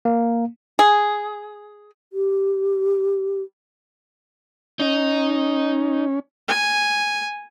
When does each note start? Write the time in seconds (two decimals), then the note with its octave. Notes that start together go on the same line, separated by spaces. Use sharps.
0.05 A#3
0.79 G#4
2.13 G4
4.79 C#4 D#4 D#5
6.49 G#5